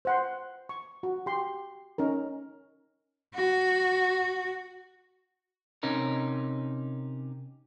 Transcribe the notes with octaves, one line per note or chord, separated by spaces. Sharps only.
C5 F#5 C6
C#6
F#4
G4 C6
C#4 D#4 A#4
F#4
C3 C#4 D#4 A#4